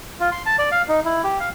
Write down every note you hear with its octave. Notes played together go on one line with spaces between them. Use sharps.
F4
C6
A5
D5
F5
D#4
E4
G4
F5